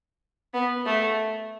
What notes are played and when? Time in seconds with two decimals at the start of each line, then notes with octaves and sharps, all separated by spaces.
0.54 B3
0.86 A3